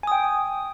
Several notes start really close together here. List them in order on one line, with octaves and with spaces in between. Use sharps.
G#5 D#6 G5